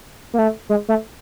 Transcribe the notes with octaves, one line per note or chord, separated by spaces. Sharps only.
A#3
A3
G#3
A3